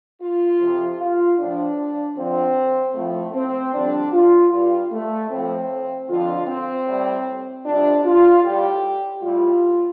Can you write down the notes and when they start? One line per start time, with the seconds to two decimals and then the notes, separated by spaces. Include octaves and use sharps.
0.22 F4
0.60 F2 C3 F3
0.99 F4
1.39 A2 F3 D4
2.17 F2 D3 F3 C4
2.95 A2 F3 A3
3.35 C4
3.73 F2 D3 G3 D4
4.13 F4
4.52 G2 G3 F4
4.92 A3
5.30 A2 F3 C4
6.09 F2 D3 F3 F4
6.48 C4
6.87 A2 G3
7.65 F2 C3 G3 D4
8.05 F4
8.43 A2 G3 G4
9.22 A2 G3 F4